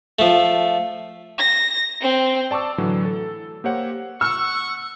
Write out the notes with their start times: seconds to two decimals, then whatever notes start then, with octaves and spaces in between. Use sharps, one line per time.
0.19 F3 A3
1.38 A#6
2.01 C4
2.51 D5 A5 C#6 D6 E6
2.78 A2 D3 E3 F#3
3.05 A4
3.64 A#3 G4 C5 C#5 F#5
4.21 F#5 C#6 E6